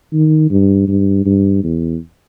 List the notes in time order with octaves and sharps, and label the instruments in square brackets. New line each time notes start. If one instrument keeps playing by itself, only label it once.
[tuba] D#3
G2
G2
G2
E2